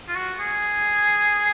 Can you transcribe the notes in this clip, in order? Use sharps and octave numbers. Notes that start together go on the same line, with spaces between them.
F4
F#4
G#4